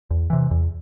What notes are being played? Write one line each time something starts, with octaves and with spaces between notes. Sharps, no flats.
E2
C3 E3
E2